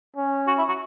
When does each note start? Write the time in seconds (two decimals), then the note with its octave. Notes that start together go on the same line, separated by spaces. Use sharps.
0.16 C#4
0.47 F#4
0.58 E4
0.69 F#4